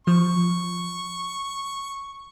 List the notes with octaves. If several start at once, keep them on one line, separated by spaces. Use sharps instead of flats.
F3 C#6